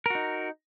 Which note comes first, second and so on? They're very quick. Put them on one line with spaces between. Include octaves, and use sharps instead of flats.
A#4 F#4 D#4